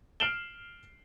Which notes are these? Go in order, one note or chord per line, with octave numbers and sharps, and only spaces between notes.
F6 C7 D7 E7 F#7 G7